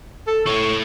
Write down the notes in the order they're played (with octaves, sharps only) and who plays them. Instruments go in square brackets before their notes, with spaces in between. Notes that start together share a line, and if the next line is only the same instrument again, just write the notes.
[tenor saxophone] A4
[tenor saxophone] A2 [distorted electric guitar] A4 C#5 [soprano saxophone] C#6